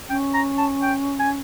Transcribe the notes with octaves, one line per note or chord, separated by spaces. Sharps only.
C#4 G5
A#5
A5
G5
G#5